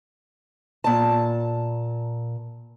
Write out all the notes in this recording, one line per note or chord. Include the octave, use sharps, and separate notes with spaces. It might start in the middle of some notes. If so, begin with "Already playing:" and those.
A#2 A5